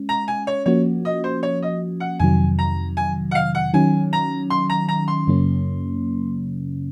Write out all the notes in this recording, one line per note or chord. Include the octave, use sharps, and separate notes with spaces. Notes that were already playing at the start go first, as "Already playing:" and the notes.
Already playing: G#3 C#4
A#5
G#5
C#5
F3 A#3 C#4 F#4 C#5
D#5
C5
C#5
D#5
F#5
F2 C3 D#3 F#3 G#5
A#5
G#5
F#5
F5
F#5
D#3 F#3 C#4 G#5
A#5
C6
A#5
A#5
C6
F#2 C#3 F#3 A#3 C#4